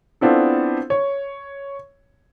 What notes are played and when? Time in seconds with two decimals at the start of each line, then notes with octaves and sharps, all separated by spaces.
0.21 B3 C4 D4 E4 F4 A4
0.90 C#5